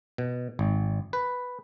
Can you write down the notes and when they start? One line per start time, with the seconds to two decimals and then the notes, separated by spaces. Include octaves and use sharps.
0.18 B2
0.59 G#1
1.13 B4